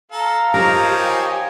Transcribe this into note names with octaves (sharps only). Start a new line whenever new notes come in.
A4 F5 A#5
F3 D#4 G4 A#4 C#5
G4 F5 G#5